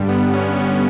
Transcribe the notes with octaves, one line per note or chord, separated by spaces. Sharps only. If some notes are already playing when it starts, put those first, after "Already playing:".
Already playing: G2 D3 G3
B3
C#4
C#4